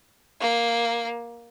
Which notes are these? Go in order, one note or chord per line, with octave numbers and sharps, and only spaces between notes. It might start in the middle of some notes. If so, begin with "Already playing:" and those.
A#3